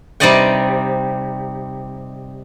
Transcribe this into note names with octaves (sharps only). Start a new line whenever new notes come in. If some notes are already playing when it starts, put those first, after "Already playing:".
C3 G3 D#4 D5 D#5 G5